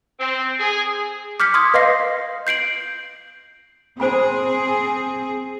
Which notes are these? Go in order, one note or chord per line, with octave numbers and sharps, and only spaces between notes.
C4
G#4
D6 F6 G6 B6 C#7
C6 D#6 G#6
B4 D#5 F5 C6 A#6 C7
G6 C7 D7 F#7
C4 G#4 C5 G#5 B5